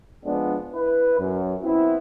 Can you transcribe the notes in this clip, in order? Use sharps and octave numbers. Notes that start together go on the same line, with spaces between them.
F3 G#3 B3 D4
E4 B4
F#2
B3 C4 E4